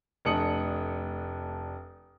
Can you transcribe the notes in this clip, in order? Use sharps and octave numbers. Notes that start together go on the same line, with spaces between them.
F1 A3 D4 D#6 C#7 F#7